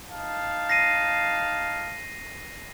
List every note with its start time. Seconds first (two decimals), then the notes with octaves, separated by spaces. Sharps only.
0.10 D#4 F5 A5
0.70 A#6 C7 D#7